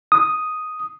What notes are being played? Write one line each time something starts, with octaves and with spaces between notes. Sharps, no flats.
D#6